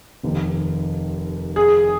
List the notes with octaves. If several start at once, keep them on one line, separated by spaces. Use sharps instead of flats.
F1 D#2 D#3
G#4